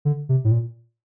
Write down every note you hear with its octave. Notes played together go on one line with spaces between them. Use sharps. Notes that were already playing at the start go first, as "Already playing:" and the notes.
D3
C3
A2
A#2